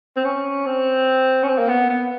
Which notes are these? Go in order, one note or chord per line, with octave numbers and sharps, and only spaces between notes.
C4
C#4
C4
C#4
C4
A#3
B3
B3